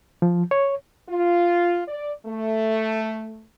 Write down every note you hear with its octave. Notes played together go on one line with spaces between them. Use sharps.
F3
C#5
F4
D5
A3